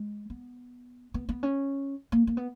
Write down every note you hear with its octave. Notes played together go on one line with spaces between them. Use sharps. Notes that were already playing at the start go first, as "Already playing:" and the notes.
Already playing: G#3
B3
B3
B3
C#4
A#3
A#3
B3